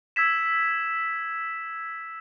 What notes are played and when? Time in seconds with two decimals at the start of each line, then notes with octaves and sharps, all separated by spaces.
0.16 E6 G#6 B6 E7